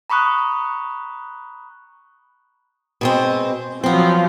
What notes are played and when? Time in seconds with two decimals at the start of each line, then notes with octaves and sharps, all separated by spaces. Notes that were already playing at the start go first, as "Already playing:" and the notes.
0.10 A#5 B5 C#6 D#6 F#6
3.01 B2 G#3 C4
3.84 F3 F#3 B3 C4